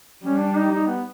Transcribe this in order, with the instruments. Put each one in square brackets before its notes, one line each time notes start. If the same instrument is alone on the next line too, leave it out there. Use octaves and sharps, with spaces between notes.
[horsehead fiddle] G3 [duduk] C#4
[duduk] D4
D#4
D#4
B3